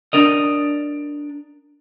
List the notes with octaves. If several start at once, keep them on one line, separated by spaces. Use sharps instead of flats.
D4 A#4 D#5